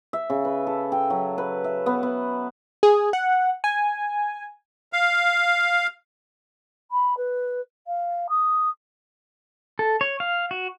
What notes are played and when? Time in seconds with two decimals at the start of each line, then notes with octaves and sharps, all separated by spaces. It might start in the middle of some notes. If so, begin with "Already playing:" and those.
0.13 E5
0.30 C#3
0.45 B4
0.67 A4
0.92 G5
1.10 F#3
1.38 B4
1.64 E5
1.86 B3
2.03 B3
2.83 G#4
3.13 F#5
3.64 G#5
4.93 F5
6.91 B5
7.17 B4
7.86 F5
8.29 D#6
9.79 A4
10.01 C#5
10.20 F5
10.51 F#4